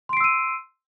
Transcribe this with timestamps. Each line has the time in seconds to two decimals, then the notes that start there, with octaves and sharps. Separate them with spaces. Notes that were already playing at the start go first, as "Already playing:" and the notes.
0.09 C6
0.13 D7
0.17 C7
0.20 E6
0.24 D#7